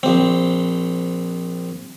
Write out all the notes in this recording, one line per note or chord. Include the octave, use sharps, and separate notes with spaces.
A#1 C4